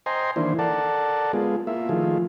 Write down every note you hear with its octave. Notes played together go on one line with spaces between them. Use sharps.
C5 D#5 G5 G#5 A#5 C6
D#3 E3 A#3 D4 E4 C5
A4 A#4 D5 F#5 A5
G#3 B3 F4 G#4
A#3 E4 F4 E5
D#3 F3 A3 F4 G#4